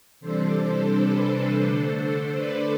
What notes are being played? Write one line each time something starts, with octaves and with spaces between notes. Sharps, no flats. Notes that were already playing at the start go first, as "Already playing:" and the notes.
C3 E3 G3 D4 A4 C5
B4
D3 A3 D4 A4 C5
B4 D5